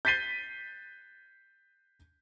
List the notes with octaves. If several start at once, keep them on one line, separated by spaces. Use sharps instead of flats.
G6 A6 B6 C7 D#7 G7